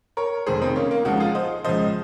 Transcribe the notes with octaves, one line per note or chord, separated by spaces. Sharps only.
A#4 C#5
F1 F2 D#3 G#4 C5
C4 D#4
A#3 C#4
A#3
C#2 C#3 F3 D#4 F#4
F4 G#4
C5 D#5
C#2 C#3 F3 C5 D#5